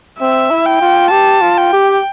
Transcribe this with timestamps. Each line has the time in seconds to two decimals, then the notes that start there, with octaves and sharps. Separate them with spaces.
0.20 C4 E5
0.50 E4
0.66 G5
0.81 F4
1.11 G4 A5
1.41 F4
1.57 G5
1.73 G4